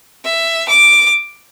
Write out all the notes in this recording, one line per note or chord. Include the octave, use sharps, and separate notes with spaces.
E5
D6